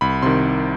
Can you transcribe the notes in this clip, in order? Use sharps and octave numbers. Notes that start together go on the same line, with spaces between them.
C2 B5
C3 D#3 C6